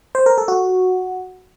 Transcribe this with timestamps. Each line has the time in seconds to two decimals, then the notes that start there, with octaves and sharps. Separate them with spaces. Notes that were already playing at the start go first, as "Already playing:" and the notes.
0.15 C5
0.26 A#4
0.38 A4
0.48 F#4